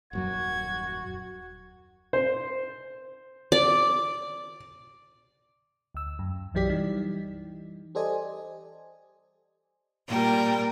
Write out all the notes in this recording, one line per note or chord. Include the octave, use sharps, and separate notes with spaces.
D#1 F#2 F#3 F#4 G#6
C5
D5
D2 E6
F#2
B1 E3 F#3 G4 D5 B6
E3 G3 D#4
G4 A4 C5 D5 D#5 G#5
A#2 G3 A#4 G5